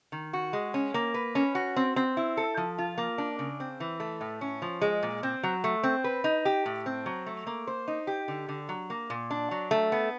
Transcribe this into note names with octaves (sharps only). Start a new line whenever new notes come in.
D#3
F#4
G#3
C#4
A#3
B4
C#4
F#4
C4
C4
E4
A4
F3
F4
A#3
D4
C#3
C4
E3
A3
A2
C#4
F3
G#3
A#2
C4
F#3
A3
C4
B4
D#4
G4
A2
C4
F#3
A3
A#3
C5
D#4
G4
D3
D3
F#3
A#3
A#2
D4
F#3
A3
B3